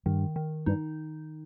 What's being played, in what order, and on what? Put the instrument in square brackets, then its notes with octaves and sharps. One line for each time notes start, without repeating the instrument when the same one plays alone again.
[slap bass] G2 [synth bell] D#3
[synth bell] D#3
[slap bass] G2 [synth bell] D#4